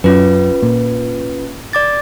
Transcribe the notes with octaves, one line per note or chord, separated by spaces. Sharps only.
F#2 C#4 F4 B4
A#2
D5 D6 A6